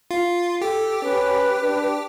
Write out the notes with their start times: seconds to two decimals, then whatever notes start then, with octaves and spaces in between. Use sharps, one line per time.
0.11 F4
0.61 G4 A4
1.02 C#4 B4
1.63 D4